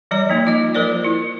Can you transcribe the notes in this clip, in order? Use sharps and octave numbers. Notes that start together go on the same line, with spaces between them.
E3 G3 D5 A#5
F3 A#3 D#4
F4 D#5
F3 F4 A#4 C5 D5
E4